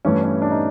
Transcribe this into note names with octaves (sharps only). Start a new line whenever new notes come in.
G2 E3 A3 C#4
C#4
D4
D#4